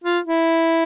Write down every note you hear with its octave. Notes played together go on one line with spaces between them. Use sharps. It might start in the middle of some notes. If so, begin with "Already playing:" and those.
F4
E4